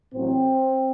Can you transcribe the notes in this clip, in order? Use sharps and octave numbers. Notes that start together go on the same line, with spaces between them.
A1 A2 F#3 C4